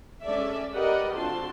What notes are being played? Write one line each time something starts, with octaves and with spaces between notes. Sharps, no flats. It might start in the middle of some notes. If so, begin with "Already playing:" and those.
G#3 C#4 A4 D5 E5
G4 A#4 B4 D5 D#5 F#5
D3 C4 F4 F#4 A5 C6